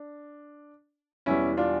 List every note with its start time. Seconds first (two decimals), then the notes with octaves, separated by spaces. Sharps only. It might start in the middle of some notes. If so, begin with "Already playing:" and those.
Already playing: D4
1.26 E1 E2 E3 G3 C#4 E4
1.57 D4 F4